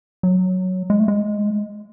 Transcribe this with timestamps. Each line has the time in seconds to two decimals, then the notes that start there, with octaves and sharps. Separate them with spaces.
0.23 F#3
0.90 G#3
0.99 A3
1.08 G#3